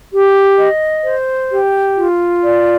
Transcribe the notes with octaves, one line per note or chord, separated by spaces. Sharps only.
G4
D#5
C5
G4
F4
D5